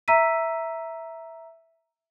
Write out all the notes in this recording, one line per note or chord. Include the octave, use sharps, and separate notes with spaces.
E5 A#5 E6 B6 D#7